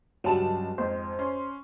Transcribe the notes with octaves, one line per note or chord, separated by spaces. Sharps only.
C#2 G2 F#3 G3 A5 E7
F2 G#2 C5
C#4 C6